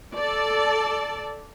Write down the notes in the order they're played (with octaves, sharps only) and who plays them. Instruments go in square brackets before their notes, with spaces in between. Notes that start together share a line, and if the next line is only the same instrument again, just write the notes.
[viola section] A4 D5 A5